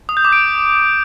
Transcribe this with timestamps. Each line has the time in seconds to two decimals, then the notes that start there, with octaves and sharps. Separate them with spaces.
0.09 D#6
0.17 G6
0.25 D6
0.32 D7